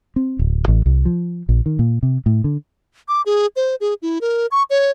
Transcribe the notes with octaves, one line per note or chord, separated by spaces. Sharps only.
C4
D1
A1
C2
F3
A#1
D#3
A#2
C3
A2
D3
D6
G#4
C5
G#4
E4
A#4
C#6
C#5